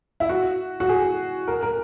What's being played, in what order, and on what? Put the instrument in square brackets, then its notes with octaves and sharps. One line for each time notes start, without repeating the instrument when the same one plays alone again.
[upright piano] E4
F#4
F#4
G#4
A#4
A#4